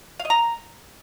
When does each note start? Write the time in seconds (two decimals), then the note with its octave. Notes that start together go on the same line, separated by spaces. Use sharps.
0.19 F5
0.25 D#5
0.30 A#5